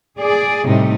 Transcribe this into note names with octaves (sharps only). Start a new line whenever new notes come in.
G#4 D5
A2 C3 G3 A3 D#4